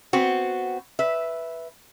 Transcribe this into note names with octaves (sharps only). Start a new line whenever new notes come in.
B3 C4 F#4
B4 E5